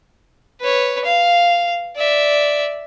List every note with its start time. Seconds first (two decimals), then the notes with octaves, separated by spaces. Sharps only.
0.61 B4 C#5
1.05 F5
1.96 D5 E5